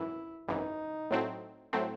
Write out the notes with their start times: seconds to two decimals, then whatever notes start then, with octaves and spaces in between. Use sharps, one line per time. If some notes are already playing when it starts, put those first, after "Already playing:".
Already playing: G#1 F#2 E3 E4
0.48 G#1 F#2 E3 D#4
1.11 A2 F#3 A3 C4
1.73 A2 F#3 A3 C4